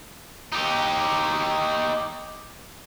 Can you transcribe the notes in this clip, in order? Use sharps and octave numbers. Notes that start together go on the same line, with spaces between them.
D#4 G4